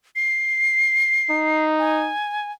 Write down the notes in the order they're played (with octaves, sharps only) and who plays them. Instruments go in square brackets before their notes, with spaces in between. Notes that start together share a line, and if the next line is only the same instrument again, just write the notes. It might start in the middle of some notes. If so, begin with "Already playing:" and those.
[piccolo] C7
[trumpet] D#4
[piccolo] G#5